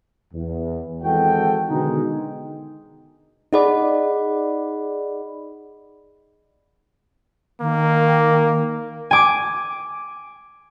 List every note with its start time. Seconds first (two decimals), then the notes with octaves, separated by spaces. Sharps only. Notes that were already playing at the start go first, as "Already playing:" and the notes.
0.34 E2
1.04 G#1 E3 G#3 F#4 A4 G5
1.69 B2 D3 D#3 G#3 D#4
3.53 D#4 G#4 D5 D#5 F#5 B5
7.61 D#3 A#3
9.11 G#5 D6